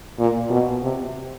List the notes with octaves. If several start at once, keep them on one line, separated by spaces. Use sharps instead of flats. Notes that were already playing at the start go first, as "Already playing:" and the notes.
A#2
B2
C3